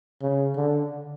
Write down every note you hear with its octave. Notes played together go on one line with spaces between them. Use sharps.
C#3
D3